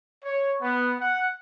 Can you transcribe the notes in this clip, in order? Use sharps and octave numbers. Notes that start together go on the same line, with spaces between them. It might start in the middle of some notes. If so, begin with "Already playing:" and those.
C#5
B3
F#5